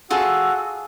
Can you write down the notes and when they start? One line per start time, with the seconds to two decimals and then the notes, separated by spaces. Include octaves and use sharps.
0.10 F4 F#4 G#4 A4 E6